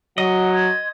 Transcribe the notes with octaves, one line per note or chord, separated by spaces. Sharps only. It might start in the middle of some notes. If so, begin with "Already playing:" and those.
F#3 D#5 F#5
C6 G#6